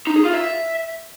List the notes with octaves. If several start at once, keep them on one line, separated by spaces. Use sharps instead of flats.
D#4
G#4
F4
E5